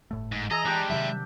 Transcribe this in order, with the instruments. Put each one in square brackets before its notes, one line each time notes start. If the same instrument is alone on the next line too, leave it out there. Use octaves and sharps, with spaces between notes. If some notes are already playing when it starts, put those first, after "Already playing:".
[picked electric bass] G1 A2 A3
[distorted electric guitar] G#2
[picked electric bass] E3 [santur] G#4 E6 [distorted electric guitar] D#5 [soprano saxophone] A#5
[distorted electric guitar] G3 G#3 [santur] D4 G4
[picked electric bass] C3 D#3 F#3 [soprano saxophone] E5